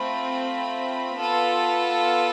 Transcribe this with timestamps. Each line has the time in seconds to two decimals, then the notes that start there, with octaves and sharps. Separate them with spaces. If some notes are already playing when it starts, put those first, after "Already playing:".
Already playing: A3 C4 F4 B5
1.15 B3 F4 A4